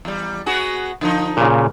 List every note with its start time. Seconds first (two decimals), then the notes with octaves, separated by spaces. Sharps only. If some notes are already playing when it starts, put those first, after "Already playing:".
0.05 E2 G3
0.46 B3 F#4 G#4
1.01 D3 F3 D#4
1.37 A#2 C#3